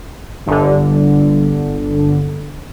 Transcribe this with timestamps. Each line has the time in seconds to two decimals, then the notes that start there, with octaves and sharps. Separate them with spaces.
0.46 G1 D3